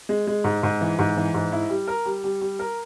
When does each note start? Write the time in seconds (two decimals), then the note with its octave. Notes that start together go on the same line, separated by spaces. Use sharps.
0.09 G#3
0.27 G#3
0.44 G#2
0.63 G#2
0.81 E3
0.99 G#2
1.17 E3
1.34 G#2
1.52 E4
1.70 G3
1.88 A#4
2.05 G3
2.24 G3
2.41 G3
2.59 A#4